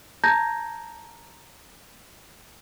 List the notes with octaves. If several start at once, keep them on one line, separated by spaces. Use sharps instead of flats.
A5 A#5 G6 G#6 A#6